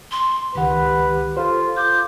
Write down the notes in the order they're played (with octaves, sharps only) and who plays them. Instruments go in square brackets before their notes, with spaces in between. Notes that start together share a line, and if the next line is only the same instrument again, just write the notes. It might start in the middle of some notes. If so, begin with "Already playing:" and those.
[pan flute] C6
[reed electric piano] C#2 D#3 F#5 [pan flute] G4 [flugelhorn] B4
[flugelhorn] F4 [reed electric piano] A4 C5
[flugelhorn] F4 [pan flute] D6 [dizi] G6